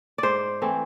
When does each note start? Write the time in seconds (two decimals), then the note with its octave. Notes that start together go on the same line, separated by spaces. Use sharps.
0.18 G#2 C5 D5
0.62 E3 A3 C4